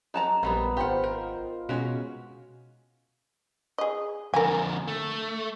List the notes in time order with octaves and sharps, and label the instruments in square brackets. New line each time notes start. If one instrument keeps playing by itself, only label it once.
[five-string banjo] F#3 A5 A#5 [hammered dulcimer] D#4
[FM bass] A#1 [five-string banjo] F#3 G3 A#3 [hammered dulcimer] B3 B4
[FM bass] G#1 [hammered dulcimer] F4 C5 [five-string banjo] G4 F#5
[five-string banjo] A#4
[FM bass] B2 [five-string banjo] G#3 C#4 F#4
[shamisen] G#4 D#5
[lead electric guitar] F2 D3 [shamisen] A#4 G#5
[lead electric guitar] A3